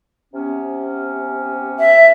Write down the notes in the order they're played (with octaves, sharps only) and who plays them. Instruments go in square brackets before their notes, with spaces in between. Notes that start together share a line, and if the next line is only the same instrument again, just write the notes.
[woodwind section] C3 B3 C#4
[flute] E5